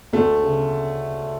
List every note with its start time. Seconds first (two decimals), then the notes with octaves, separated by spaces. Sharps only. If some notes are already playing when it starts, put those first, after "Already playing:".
0.13 D2 A3
0.43 C#3